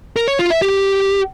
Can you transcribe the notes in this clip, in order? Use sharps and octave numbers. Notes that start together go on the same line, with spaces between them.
A#4
C#5
F4
E5
G4